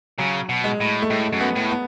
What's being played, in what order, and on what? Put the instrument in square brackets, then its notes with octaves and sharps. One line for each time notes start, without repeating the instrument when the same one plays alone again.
[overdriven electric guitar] C#3 [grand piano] F#3
[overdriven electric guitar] B2
[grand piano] G#3
[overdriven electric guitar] A2
[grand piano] A3
[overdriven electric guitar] A2 [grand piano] G#3
[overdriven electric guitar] F#2
[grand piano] B3
[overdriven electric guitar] A2
[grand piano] B3